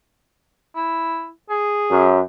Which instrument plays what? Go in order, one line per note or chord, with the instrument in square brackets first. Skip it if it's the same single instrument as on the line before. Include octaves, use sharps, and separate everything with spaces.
[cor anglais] E4
G#4
[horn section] F#2